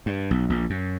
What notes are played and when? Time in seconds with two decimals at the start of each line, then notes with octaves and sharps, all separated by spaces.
0.06 G2
0.31 B1
0.50 A#1
0.70 F#2